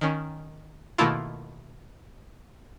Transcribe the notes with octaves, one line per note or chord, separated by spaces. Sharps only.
D#3 C#4
B2 D#3 A3 A#3 E4 F4